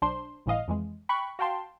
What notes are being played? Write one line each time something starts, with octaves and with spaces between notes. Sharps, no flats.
B1 D4 C5 C6
G1 A2 E3 D#5 F5
F2 E3 G#3
G5 B5 C#6 F#6
F#4 F5 G5 A5 C6